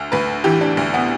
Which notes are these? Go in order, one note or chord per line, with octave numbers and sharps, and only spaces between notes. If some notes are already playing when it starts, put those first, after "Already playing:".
Already playing: D2
D2 B4
E3 G4
D4
D2
B3